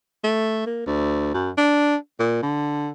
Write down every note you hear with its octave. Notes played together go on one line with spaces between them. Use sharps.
A3
A#3
D2
F#2
D4
A#2
D3